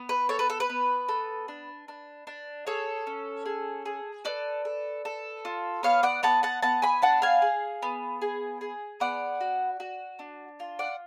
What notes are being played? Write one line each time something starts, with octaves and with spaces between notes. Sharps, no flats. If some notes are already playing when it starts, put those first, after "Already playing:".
Already playing: B3
B4
A4 C#5
B4
A4
B4
B3
A4
D4
D4
D4
G#4 A4 C#5
C#4
G#4
G#4
A4 B4 D5
A4
A4
F4
B3 C#5 F5
D5 F#5
B3 F#5 A5
F#5 A5
B3 F#5 A5
G#5 B5
D4 F#5 A5
F5 G#5
G#4
B3
G#4
G#4
B3 D5 F#5
F#4
F#4
D4
F4
D5 F#5